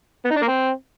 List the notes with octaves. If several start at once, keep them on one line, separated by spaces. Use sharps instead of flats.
B3
D#4
D4
A#3
C4